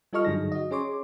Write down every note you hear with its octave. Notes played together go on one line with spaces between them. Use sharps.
G3 F4 A4 D#5 C#6 F6
G2 D3 F#3 D#4 G#4 A#6
F#4 D#5
C#4 G#4 C#5 C6 D6